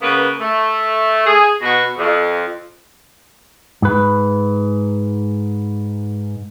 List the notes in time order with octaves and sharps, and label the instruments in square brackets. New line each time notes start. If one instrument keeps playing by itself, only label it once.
[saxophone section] C#3 A#3 B3 B4
A3
G#4
B2 F#4
F2
[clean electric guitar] G#2 B4